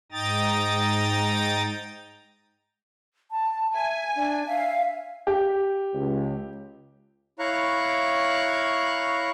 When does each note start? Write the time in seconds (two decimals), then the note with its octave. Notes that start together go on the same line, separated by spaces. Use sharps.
0.12 G#2 D#4 G5 A#5 D#6 A6
3.31 A5
3.74 E5 G#5
4.16 D4
4.47 E5 F5
5.27 G4
5.94 C#2
7.39 E4 C#5 F5 A#5 C#6 F#6